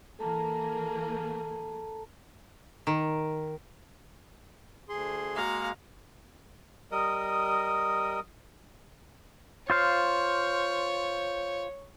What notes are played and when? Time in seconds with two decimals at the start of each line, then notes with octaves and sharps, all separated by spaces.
0.19 E3 A#3 G#4 A4 A5 A#5
2.87 D#3
4.89 D2 G#4 C6
5.36 G#3 A#3 F#4 F5 A#5
6.91 G3 A#4 D#5 D#6
9.70 F4 C5 C#5 F5